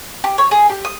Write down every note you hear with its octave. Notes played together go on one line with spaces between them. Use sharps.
G4
C#5
G#4
G4
D#6